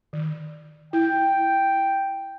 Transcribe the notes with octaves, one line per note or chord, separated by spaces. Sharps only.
D#3
E4 G5